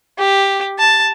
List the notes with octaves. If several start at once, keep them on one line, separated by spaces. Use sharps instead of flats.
G4
A5